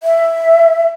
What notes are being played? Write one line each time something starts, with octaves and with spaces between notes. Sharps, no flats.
E5